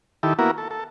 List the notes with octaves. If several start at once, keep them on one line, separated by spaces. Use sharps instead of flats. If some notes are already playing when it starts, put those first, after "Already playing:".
D#3 E4 G4 A4
A#3 B3 E4 F#4 A#4
A4
A4